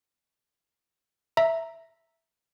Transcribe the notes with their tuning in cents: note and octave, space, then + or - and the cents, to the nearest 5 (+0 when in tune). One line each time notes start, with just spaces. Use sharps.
E5 +0 A#5 +0